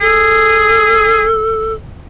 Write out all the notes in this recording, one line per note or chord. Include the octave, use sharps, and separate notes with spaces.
G#4 A4